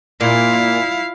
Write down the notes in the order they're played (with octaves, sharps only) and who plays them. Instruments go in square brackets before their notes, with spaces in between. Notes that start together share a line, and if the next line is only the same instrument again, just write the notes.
[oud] A#2 [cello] E4 F5